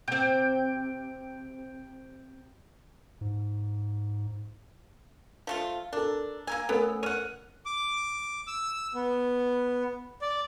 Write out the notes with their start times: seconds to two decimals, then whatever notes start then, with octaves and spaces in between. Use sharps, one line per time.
0.08 C3 C4 G5
3.21 G#2
5.47 F3 A3 F4
5.93 D4 A4 A#4
6.47 A#3 A#4 G#5 E6
6.69 A3 B3 C#4 A4 A#4 G#5
7.03 C#5 F#5 F6 D#7
7.66 D6
8.47 E6
8.95 B3
10.22 D5